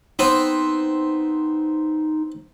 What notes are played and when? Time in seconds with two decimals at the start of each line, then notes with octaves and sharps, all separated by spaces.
0.19 B3 C4 D#4